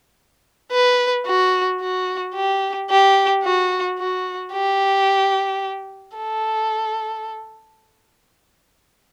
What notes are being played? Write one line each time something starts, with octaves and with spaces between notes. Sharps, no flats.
B4
F#4
F#4
G4
G4
F#4
F#4
G4
A4